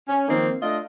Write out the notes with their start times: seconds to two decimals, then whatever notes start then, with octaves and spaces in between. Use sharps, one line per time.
0.08 C#4
0.28 D#3 F3 A#3 C4 D#4
0.62 A3 D4 F4 D#5